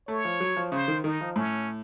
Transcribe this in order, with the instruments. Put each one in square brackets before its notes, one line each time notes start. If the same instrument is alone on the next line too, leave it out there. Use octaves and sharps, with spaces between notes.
[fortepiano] A3 [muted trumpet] C#5
[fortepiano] F3
F#3
F3
[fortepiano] C#3 [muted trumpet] C5
[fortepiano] D#3
[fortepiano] D#3 [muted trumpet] D#4
[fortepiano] F3
[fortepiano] A2 [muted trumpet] C#4